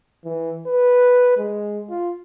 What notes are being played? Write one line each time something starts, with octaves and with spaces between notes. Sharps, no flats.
E3
B4
G#3
F4